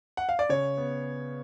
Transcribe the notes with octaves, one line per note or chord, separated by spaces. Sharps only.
F#5
F5
D5
C#3 C#5
B3